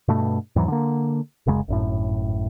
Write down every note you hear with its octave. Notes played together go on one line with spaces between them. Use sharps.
G2 B2 A3
E2 G#2 E3 F#3
D3 A#3
D1 F#2 C#3 G#3
G#1 F#2 A2